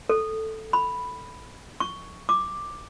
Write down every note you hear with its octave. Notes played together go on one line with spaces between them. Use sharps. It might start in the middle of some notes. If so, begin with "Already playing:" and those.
A4
B5
C#6
D6